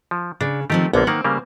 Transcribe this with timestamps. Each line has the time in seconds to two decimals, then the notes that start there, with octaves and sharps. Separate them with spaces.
0.11 F3
0.41 C#3 D4
0.70 D#3 F3 A3 C4 G4
0.93 A#1 D3 A#3 B3
1.07 D#3 A#3 C4 F#5
1.24 C#3 G3 A#3